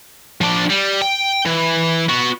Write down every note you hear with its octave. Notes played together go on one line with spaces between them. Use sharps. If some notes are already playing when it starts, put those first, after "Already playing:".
F3 D4
G3
G5
E3
B3 F#4